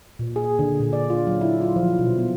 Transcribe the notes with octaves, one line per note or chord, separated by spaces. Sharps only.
A#2
G#4
D3
A#2
D5
F4
F#3
E4
F4
F3
B2
B3